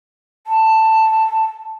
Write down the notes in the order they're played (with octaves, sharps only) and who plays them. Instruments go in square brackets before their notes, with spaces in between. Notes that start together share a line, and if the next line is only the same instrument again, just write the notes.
[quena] A5